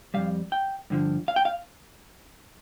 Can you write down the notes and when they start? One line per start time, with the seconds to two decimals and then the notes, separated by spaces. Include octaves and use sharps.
0.14 F2 C3 G3 F5
0.52 G5
0.90 G2 D3 F3
1.28 F5
1.36 G5
1.45 F5